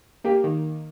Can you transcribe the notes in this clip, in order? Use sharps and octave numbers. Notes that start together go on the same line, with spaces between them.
A#3 G4
D#3